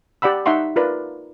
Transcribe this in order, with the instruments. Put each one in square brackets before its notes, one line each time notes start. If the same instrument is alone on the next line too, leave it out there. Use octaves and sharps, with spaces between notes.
[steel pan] G4 D5 F#5 B5 E6
D#4 E5 F#5 C6 C#6
F4 A#4 B4 D5